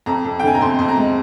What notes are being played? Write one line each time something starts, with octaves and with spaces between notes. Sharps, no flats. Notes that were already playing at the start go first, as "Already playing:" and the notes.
F2 A#5
F2
G5
D3 G#5
A#5
F2 C6
F2
A#5
G#3